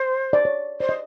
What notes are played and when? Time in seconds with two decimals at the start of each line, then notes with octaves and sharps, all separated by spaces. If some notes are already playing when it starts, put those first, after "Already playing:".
Already playing: C5
0.33 D5
0.45 C#5
0.80 C5 D5
0.89 D#5